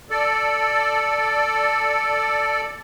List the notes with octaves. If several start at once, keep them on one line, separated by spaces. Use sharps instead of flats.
A4 D5